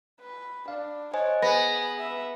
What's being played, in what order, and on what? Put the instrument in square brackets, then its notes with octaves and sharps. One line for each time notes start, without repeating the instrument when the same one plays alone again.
[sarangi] B4
[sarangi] D4 [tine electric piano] F5
[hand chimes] C5 D#5 G#5 [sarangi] C#5
[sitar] B3 [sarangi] G#4 [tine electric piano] B4 [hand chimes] A#6
[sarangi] E5